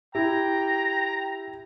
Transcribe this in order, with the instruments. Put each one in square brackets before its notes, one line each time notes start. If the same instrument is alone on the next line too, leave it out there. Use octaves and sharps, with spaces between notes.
[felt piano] E4 [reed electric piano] G4 [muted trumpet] G5 [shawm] A#5